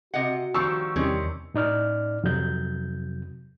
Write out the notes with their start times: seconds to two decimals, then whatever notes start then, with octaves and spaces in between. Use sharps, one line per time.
0.14 C3 F#4 D#5 F#5
0.54 D#3 F3 G3 C#6 E6
0.96 E2 C3 D#3 G3 C#4
1.54 A2 D#4 D5 F6
2.24 F2 C3 F#3 G6